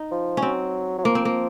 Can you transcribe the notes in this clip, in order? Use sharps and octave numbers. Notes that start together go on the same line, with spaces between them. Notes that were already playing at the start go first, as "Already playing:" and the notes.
Already playing: D#4
F3
C#4
F#3 C4
F#3
F3 A#3
C4
A#3